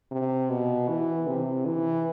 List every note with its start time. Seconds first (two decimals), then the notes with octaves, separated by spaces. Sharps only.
0.11 C3
0.50 B2
0.89 E3
1.27 C3
1.66 E3